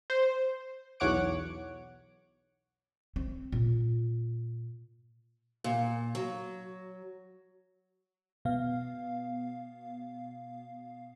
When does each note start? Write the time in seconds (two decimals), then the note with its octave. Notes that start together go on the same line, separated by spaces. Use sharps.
0.10 C5
1.00 B1 E2 C#5 F#5 D6 D7
3.16 C4
3.52 A#2
5.64 A#2
6.15 F#3
8.45 B2 B3 F5